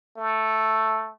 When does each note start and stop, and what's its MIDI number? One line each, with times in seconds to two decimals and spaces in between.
0.17 1.10 57